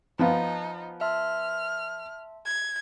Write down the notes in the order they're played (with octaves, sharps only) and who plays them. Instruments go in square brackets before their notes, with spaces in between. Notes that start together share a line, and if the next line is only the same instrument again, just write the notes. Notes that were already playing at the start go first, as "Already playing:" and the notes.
[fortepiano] F3 B3 F4 [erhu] D#4
[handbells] E5 A5 C6 [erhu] F6
[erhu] G#6